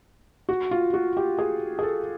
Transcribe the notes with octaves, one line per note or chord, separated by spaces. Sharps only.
F#4
F4
F#4
G4
G#4
G#4
A4